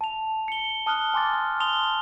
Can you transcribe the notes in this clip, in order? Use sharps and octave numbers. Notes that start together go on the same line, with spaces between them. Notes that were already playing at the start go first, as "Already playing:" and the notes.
A5 F7
C#7 G7
A5 D#6 F6 F#6 G7
G#5 C6 D6 A6
F6
A5 C6 D#6 F7 G7